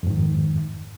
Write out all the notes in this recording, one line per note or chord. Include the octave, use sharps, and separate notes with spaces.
F2 G#2 D#3